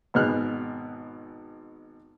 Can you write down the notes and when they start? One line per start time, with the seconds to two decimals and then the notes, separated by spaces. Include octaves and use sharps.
0.14 G#1 B2 G#4 F6 F#6